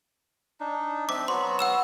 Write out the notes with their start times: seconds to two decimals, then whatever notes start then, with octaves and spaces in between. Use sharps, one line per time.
0.60 D4 D#4
1.09 C4 E5 D6
1.28 F#3 B3 F#4 C6
1.59 F#5 E6 E7